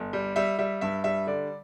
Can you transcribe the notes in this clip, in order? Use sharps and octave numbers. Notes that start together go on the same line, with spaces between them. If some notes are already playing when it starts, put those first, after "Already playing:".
Already playing: G1
G3
G3 E5
G3 E5
G2 E5
G3 E5
D3 D5